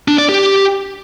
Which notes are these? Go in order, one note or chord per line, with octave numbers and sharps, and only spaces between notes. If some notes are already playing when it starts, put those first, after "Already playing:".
D4
D5
G4